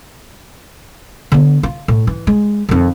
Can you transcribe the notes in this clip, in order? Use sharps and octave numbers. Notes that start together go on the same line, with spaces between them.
D3 B3
F4
A2
E3
G#3
F2 D#3